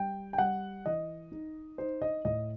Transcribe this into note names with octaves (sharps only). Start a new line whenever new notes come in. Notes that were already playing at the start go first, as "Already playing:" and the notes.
Already playing: G3 G5
G5
G3 F#5
E3 D#5
D#4
D#4 C5
D#5
A2 D#5